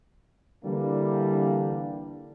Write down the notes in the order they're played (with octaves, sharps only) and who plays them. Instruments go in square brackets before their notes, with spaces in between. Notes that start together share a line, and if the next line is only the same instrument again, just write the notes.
[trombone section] D3 E3 G3 A#3 D4